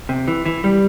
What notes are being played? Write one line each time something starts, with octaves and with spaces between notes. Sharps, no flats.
C3
E3
E3
G3